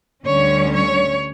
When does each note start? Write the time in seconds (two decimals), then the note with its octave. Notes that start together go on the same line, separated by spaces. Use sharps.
0.25 D2 D3 G3 C#4 C#5
0.72 C#5